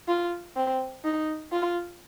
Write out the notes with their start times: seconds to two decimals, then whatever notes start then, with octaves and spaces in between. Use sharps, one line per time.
0.08 F4
0.56 C4
1.04 D#4
1.52 F4